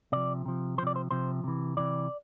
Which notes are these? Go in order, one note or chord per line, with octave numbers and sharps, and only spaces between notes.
C3 F3 D5
C3 F3
C3 F3 C5 D5
C5
C3 F3 C5
C3 E3
C3 E3 D5